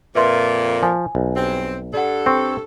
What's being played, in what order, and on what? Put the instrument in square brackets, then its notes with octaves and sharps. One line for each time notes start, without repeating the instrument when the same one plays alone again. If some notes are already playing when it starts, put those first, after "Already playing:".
[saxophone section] F2 A#2 [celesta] B4 E5 C6
[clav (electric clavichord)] F3 [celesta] G#5
[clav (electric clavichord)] B1
[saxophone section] G2 C4
[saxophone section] G2 A4 [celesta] D5 F#5
[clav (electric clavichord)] C4 [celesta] C#6 E6